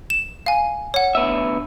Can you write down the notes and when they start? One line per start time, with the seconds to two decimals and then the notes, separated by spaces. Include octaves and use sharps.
0.10 E7
0.46 F5 G#5
0.94 C#5 F#5
1.15 D2 B3 E5